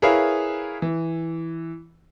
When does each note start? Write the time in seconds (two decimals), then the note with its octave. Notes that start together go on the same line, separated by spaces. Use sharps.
0.02 E4 G#4 A#4 B4 C#5 F5
0.82 E3